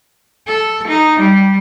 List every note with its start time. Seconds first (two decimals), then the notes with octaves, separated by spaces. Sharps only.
0.47 A4
0.88 D#4
1.20 G3